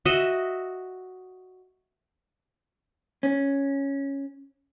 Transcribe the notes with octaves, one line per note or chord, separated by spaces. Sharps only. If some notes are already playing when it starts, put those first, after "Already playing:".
F#4 D#5 E5
C#4